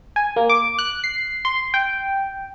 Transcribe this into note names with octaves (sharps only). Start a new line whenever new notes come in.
G#5
A#3
D6
F#6
C7
C6
G5